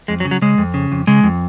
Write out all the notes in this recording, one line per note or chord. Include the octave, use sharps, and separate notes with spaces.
F2 G#3
F#3
C#3
F#3
C#3 G#3
F2
C#3
F2
C#3 G#3
F2